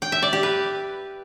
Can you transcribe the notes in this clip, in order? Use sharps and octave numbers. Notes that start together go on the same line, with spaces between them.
G5
E5
D5
G4
B4